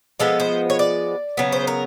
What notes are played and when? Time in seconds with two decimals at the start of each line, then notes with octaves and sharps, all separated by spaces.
0.20 F3 G#3 B3 A4
0.40 C5
0.70 C#5
0.79 D5
1.37 C#3 F#3 B3
1.52 C5
1.67 A#4